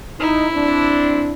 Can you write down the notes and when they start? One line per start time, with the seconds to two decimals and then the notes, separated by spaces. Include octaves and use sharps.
0.20 D#4 E4
0.54 C4 D4